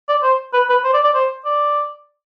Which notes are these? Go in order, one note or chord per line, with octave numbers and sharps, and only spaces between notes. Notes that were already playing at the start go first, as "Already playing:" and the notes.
D5
C5
B4
B4
C5
D5
D5
C5
D5